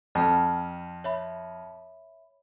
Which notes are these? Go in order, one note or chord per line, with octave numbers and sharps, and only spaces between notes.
F2 G5 A5 F6
C#5 E5 B5